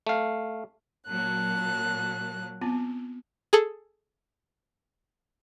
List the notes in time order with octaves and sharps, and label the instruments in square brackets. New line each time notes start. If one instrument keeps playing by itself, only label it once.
[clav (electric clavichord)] A3 F5
[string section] A#2 F#3 A#3 [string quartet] A5 F#6
[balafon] B3 C4 F4
[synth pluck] G#4 A4